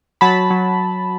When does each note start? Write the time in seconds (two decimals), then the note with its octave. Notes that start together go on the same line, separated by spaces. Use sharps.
0.21 F#3 A5 B5
0.50 F#3